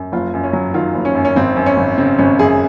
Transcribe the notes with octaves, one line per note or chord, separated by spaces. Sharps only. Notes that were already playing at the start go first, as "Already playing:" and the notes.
Already playing: F#2
F#1 F4
F#2
C#4
F#3
D#3 F4
F#1
C#4
F#2
C#4
G#1 C4
F#2
C#4
G#1
C#3 C4
G#1 C#4
F#2 G#4